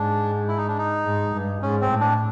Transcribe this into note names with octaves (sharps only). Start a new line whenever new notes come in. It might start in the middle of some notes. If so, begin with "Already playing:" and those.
Already playing: G#2 D4
E4
D#4
D4
D#4
G#2
G2
G#2 C#4
C4
A2
D4